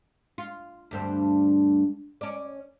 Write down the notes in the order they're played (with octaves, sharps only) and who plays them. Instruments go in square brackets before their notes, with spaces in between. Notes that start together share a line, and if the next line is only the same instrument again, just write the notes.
[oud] F4
D2 G2 C4
C#4 D5